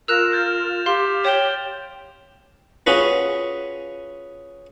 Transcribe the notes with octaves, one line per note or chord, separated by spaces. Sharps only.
F4 A#4 E6 F#6 E7 F7
F6 G6 A6
G4 F5 C6
C#5 G5 E7 G7
C#4 F4 F#4 G#4 B4